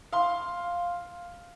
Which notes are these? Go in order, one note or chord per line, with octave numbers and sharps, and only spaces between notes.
F5 C6